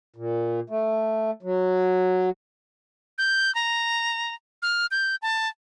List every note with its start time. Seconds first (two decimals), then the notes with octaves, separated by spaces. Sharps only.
0.16 A#2
0.70 A3
1.43 F#3
3.18 G6
3.55 A#5
4.62 F6
4.91 G6
5.22 A5